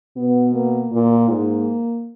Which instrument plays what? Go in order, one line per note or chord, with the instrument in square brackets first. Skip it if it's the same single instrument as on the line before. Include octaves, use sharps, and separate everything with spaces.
[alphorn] B2 [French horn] B3
[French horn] A#3
[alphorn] A#2
G#2